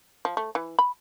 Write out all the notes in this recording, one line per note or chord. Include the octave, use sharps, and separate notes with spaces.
F3
A3
E3
B5